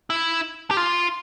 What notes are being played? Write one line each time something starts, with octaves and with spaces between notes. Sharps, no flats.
E4
G4
F4